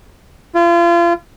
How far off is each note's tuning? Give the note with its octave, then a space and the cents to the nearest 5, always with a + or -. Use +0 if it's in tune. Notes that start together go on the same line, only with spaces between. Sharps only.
F4 -35